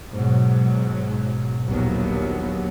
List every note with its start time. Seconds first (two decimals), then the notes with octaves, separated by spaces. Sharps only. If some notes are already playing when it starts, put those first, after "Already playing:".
0.11 G#2 B2 F#3
1.67 A#1 D#2 F#3 B3